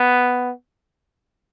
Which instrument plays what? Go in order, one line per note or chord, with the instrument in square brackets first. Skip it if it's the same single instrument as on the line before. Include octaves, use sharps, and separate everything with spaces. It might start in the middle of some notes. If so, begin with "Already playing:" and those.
Already playing: [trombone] B3